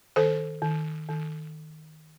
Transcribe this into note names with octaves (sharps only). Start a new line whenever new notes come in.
D#3 A4 C5
D#3
D#3